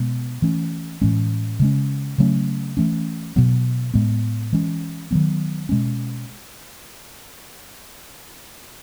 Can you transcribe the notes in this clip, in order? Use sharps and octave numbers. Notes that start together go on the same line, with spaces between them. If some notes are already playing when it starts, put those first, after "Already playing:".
Already playing: B2 G#3 B3
E3 A3 C#4
A2 E3 G#3 C#4
C#3 G#3 C#4
C#3 F#3 A3 C#4
E3 A3 C#4
B2 F#3 B3
A2 G#3 B3
E3 G#3 C#4
D#3 F#3 B3
B2 G#3 C#4